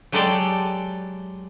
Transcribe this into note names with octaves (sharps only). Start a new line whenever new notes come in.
F#3 G#3 G4 A4 D5 G5